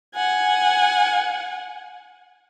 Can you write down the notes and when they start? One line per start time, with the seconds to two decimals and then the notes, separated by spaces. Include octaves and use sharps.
0.15 F#5 G#5